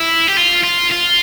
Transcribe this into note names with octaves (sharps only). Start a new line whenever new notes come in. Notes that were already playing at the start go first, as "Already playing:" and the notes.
Already playing: E4
G4
F4
F4
F4